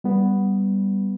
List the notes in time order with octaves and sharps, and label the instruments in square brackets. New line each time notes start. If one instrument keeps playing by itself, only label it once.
[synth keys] G3 B3